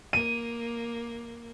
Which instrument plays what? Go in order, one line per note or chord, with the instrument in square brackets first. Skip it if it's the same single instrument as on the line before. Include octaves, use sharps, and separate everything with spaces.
[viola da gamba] A#3 [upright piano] D#7